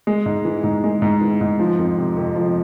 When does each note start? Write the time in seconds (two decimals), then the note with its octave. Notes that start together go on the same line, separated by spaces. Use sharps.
0.07 G#3
0.26 G#2
0.45 E3
0.64 G#2
0.84 G#3
1.02 G#2
1.21 E3
1.41 G#2
1.59 F3
1.78 F2
1.98 C3
2.17 F2
2.36 F3